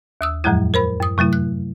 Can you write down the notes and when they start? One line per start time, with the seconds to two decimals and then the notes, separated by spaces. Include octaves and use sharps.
0.21 D#2 D#6 E6
0.44 F2 A2 F3 F#3 G#3 E4
0.74 A#4 C5 B5
1.00 F#2 D#6
1.18 C3 F#3 A3 E4
1.33 F#6